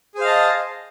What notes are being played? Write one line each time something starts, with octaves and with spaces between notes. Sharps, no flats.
G#4 C5 D#5 F5 A5